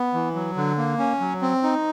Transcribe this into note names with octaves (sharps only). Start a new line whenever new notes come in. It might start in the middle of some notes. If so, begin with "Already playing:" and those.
Already playing: B3
E3
F#3
D3
A#3
C#4
F#3
C4
D#4